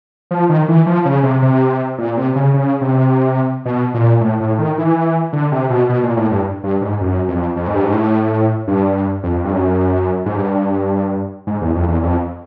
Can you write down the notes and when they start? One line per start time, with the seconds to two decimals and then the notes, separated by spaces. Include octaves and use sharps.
0.31 F3
0.49 D#3
0.68 E3
0.86 F3
1.05 C#3
1.23 C3
1.42 C3
1.98 A#2
2.17 C3
2.36 C#3
2.54 C#3
2.81 C3
3.65 B2
3.94 A#2
4.21 A2
4.40 A2
4.58 D#3
4.78 E3
5.33 D3
5.52 C3
5.70 B2
5.89 B2
6.03 A#2
6.17 A2
6.31 G2
6.64 G2
6.81 G#2
7.01 F#2
7.28 F2
7.56 F2
7.67 G#2
7.75 G2
7.84 G#2
7.93 A2
8.68 G2
9.23 F2
9.44 G2
9.52 F#2
10.26 G#2
10.36 G2
11.47 G#2
11.61 E2
11.75 F2
11.89 E2
12.03 F2